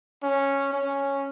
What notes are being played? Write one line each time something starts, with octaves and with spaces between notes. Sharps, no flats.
C#4
C#4